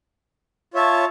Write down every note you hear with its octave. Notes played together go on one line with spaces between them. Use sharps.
F4 C#5 E5 A5